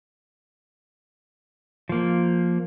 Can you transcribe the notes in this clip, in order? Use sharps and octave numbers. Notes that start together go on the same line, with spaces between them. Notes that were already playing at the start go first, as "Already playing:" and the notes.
F3 A#3